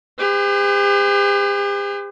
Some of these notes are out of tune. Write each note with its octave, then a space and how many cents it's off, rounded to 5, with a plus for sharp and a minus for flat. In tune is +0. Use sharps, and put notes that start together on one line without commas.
G4 +45 C5 -45